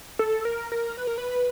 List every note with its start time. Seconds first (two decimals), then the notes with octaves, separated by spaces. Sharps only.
0.19 A4
0.45 A#4
0.72 A#4
0.97 B4
1.07 A#4
1.18 B4